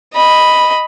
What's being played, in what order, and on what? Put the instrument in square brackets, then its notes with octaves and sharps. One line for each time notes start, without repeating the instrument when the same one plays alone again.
[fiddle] D#5 B5